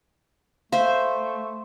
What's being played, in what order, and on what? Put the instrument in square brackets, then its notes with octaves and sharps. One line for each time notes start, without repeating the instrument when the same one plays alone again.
[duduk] A3 [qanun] C5 E5 [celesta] F5